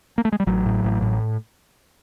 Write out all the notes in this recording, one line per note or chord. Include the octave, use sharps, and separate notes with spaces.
A#3
A3
G#3
G3
A1 F#3
A2
A1
A2